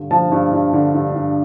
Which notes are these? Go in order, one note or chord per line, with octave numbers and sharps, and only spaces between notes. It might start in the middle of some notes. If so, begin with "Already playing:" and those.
Already playing: G2 D3
F3 A5
G2
G2
D3
G2
G2